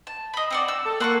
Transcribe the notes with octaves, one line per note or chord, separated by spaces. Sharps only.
A5
D#5 B5
C4 F#4 D5
E6
A4
A#3 F#5 C6 C#6